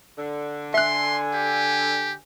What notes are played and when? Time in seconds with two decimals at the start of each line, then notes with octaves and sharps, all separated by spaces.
0.17 D3
0.74 E5 G#5 C6 F#6
1.34 G4